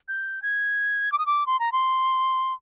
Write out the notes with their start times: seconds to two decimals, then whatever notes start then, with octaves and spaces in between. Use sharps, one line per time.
0.08 G6
0.42 G#6
1.12 D6
1.18 D#6
1.26 D6
1.46 C6
1.59 A#5
1.72 C6